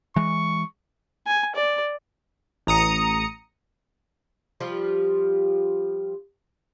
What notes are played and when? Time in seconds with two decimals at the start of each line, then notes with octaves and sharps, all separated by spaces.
0.16 E3 G#3 C#6
1.27 G#5
1.55 D5
2.67 A1 A#5 D#6 C#7
4.61 F3 G3 F4 G4